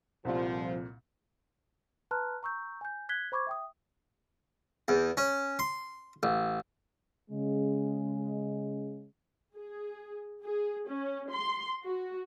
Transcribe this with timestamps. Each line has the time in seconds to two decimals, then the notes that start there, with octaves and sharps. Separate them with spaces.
0.25 C2 F2 A#2 F3 G3 F4 C5
2.11 B4 A5 A#5 C6 F6 F#6
2.43 A#5 C#6 E6 G6
2.81 G#5 G6
3.09 F#6 G#6 B6 G7
3.32 C5 B5 C#6 D6 G#6
3.47 E5 G5 D#6
4.88 E2
5.17 C#4
5.59 C6
6.23 A1
7.30 C#3 G#3
9.56 G#4
10.45 G#4
10.89 C#4
11.31 C6
11.84 F#4